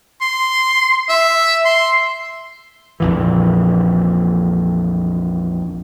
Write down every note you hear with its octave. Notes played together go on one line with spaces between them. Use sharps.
C6
E5
C6
A#1 F2 E3